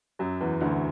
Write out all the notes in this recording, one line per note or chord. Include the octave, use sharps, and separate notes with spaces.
F#2 F#3
E2 E3
D2 D3